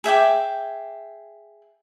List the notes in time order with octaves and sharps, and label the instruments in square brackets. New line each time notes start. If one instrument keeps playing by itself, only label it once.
[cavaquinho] G#4 E5 G5 D6